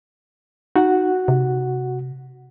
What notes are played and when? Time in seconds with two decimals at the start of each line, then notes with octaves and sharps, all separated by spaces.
0.76 D#4 F#4 F#5
1.28 C3